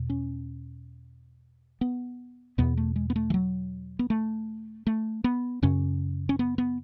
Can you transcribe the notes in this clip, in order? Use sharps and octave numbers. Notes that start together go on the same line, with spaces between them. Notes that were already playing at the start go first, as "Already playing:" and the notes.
Already playing: E2 B2
C#4
B3
E2 B2 B3
A3
G#3
B3
A3
E3
F#3
B3
A3
A3
B3
F#2 C#3 C#4
C#4
B3
B3